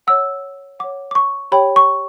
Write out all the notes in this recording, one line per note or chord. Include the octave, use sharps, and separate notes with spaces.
C#5 F#5 E6
C#5 F#5 D6
D6
C#6
G4 C#5 G5 B5
C#6